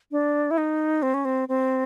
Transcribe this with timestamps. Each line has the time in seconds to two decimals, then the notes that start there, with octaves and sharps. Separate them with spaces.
0.11 D4
0.51 E4
0.58 D#4
1.03 C4
1.14 C#4
1.25 C4
1.49 C4